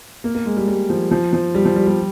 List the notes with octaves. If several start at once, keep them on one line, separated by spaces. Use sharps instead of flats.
A#3
A#3
G#3
G3
G3
F3
F3
F3
G3
F3
G3
G3